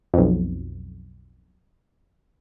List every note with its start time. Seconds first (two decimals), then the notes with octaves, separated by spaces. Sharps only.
0.14 B1 F2